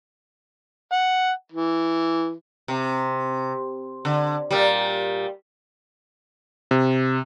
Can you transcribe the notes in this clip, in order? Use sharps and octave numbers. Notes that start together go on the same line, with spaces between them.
F#5
E3
C3
D3
A#2 G3
C3